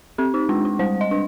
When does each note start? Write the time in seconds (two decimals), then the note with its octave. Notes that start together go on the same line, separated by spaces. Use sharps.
0.18 C4 G4
0.34 D#4
0.49 G#3 D4
0.65 D4
0.79 G3 C5
1.01 D#5
1.11 D4